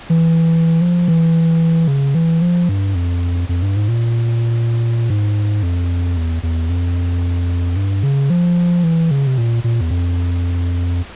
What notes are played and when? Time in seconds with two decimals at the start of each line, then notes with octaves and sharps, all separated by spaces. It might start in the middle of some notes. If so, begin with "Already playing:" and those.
0.10 E3
0.81 F3
1.08 E3
1.88 C#3
2.15 E3
2.42 F3
2.69 G2
2.95 F2
3.49 F2
3.62 G2
3.76 G#2
3.88 A#2
5.10 G#2
5.63 F2
6.17 E2
6.43 E2
6.69 F2
7.76 G2
8.03 C#3
8.30 F3
8.83 E3
9.11 C#3
9.27 C3
9.38 A#2
9.64 A#2
9.81 E2
9.90 F2